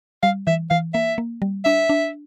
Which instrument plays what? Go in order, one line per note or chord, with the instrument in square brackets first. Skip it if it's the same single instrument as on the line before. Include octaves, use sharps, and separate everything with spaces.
[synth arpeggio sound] G3 [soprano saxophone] F5
[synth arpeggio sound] E3 [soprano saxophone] E5
[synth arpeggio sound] E3 [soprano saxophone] F5
[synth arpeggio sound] A#3 [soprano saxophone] E5
[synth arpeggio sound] A#3
G3
[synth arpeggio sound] D4 [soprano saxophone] E5
[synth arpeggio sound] D4